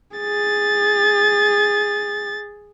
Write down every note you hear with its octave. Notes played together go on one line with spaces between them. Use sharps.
G#4 A6